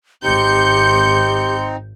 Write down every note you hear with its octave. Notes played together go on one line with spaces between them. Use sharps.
G#1 C4 D#4 G4 C6 G6 C#7